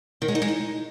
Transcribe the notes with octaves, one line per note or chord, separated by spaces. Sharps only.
D#3
G#3
D#4
G#3
D#4